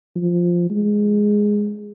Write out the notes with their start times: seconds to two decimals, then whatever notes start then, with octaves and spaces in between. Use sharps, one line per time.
0.16 F3
0.71 G#3